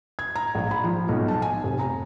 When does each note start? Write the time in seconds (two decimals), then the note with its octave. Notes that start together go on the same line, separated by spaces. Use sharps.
0.19 G#6
0.35 A#5
0.55 A#1
0.71 B5
0.84 F3
1.09 B1
1.28 A5
1.42 G#5
1.64 F1
1.79 A#5